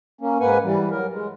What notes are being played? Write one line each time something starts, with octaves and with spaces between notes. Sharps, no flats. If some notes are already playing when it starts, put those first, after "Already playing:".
A#3 C#4
G#2 A#3 B4 F#5 G#5
E3 G3
F#3 A#4
G#3